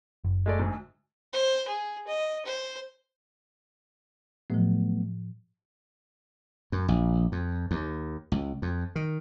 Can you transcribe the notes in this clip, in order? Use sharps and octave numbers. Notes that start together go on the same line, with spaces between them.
F#1
G#3 A3 D5
D2 G#2
C5
G#4
D#5
C5
A2 F3 F#3 A3 B3
F#2
A#1
F2
D#2
C#2
F2
D#3